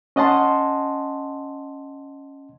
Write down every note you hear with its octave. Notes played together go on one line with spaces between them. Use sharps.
C#4 D#5 F#5 A5 C6